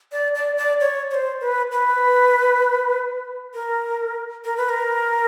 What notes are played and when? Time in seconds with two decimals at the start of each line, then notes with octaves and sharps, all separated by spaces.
0.12 D5
0.35 D5
0.57 D5
0.80 C#5
1.11 C#5
1.14 C5
1.41 B4
1.72 B4
3.54 A#4
4.45 A#4
4.57 B4
4.69 A#4